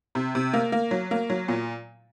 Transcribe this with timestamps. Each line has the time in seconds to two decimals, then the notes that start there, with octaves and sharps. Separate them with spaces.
0.15 C3
0.35 C3
0.53 A#3
0.72 A#3
0.91 F#3
1.11 A#3
1.30 F#3
1.48 A#2